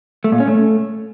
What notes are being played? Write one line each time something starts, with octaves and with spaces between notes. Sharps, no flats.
A3
A#2
C#4
A3